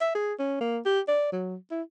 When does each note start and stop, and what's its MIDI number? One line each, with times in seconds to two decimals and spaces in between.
0.01 0.12 76
0.15 0.34 68
0.39 0.58 61
0.61 0.79 58
0.86 1.00 67
1.08 1.28 74
1.32 1.56 54
1.71 1.82 64